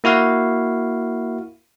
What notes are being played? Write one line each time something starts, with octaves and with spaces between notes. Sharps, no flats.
A#3 E4 F#4 F5